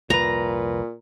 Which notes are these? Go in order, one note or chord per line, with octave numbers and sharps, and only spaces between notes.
C2 F2 A#2 B4 A#5